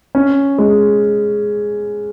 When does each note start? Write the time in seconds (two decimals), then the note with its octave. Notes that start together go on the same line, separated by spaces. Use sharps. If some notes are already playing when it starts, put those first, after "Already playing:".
0.15 C#4
0.58 G#3